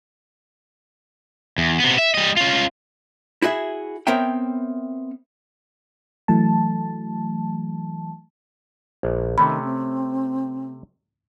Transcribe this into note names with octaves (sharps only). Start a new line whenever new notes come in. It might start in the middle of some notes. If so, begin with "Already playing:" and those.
E2
C3 B3
E5
G3 D#5
C#4 F4
E4 F#4 G#4 E5
B3 C4 A#4 C#5 E5 G5
E3 F#3 A3 A5
A#1
C3 D#3 A3 C#4 B5
C4